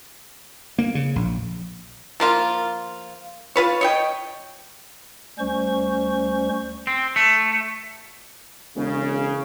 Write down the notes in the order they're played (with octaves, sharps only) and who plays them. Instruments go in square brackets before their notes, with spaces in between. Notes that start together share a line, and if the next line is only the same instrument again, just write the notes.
[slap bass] A#3
C#3
A#1
[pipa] F3 A#3 F4
F4 B4 C#5
C#5 D#5 G5
[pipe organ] D2 G3 C#4 C5 C#6
[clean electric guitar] C4
A3
[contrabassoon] E1 [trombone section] C#3